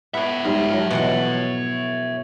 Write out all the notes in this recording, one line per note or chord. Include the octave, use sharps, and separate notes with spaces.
B3 E4 C#5 E5 F#5
G#2 G3 C5
F3 F#3
B2 E3 F#5